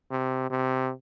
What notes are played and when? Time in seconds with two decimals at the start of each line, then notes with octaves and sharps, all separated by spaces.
0.11 C3
0.50 C3